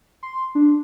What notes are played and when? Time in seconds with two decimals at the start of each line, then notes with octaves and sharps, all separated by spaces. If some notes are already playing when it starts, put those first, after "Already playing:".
0.23 C6
0.55 D4